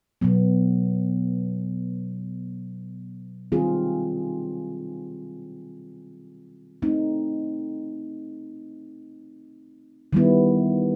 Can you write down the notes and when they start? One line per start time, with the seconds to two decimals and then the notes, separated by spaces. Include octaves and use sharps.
0.21 B2 F#3 B3
3.52 D#3 G3 C4 F4 G#4
6.82 A3 C4 D#4
10.13 D#3 G3 B3 E4